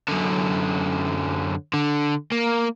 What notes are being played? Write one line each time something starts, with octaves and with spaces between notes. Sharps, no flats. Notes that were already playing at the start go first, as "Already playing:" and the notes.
F#2 D3
D3
A#3